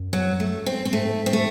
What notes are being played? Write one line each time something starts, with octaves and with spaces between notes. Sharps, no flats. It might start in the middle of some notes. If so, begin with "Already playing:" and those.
Already playing: F#2
F#3
A3
C4
C4
G#2 A3
C4
A3